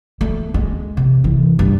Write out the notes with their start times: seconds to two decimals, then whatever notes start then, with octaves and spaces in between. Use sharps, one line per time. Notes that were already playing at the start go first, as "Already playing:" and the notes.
0.21 A3
0.54 G#3
0.97 C3
1.24 E3
1.59 G2